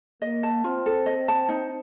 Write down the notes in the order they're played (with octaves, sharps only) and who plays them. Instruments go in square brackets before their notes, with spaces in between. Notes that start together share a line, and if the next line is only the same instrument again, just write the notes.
[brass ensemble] A#3 [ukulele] D#5
[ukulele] A5
[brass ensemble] C4 [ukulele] F4
[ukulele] A4
D#5
A5
D#4